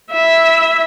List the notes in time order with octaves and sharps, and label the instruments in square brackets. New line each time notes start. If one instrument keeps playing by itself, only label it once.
[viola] E4 E5